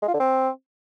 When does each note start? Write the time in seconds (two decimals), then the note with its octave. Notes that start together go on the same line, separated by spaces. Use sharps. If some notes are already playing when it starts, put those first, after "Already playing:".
0.03 G#3
0.08 F4
0.14 D3
0.20 C4